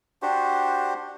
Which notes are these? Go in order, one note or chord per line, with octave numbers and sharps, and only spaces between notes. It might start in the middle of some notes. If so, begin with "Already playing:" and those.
D4 F#4 G4 C5